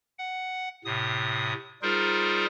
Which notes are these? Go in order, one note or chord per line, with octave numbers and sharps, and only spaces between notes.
F#5
A2 C3 D#6
G3 D#4 F4 G#4 A#4 C5